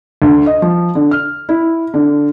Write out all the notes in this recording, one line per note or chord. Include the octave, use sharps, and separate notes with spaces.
D2
D#5
F3
D3
F6
E4
D3